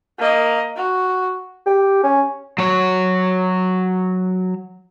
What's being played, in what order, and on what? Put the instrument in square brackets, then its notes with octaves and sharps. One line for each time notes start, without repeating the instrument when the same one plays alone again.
[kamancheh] A#3 D#5
F#4
[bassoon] G4
C#4
[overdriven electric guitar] F#3 C#5